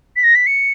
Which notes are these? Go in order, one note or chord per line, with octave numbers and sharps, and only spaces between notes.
B6
A#6
B6
C#7